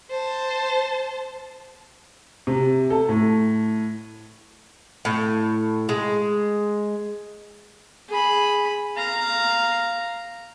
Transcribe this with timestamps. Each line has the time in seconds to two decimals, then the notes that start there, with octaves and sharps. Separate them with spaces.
0.11 C5 A5
2.47 C3
2.90 A4
3.09 A2
5.05 A2
5.89 G#3
8.09 G#4 B5
8.97 F5 A#5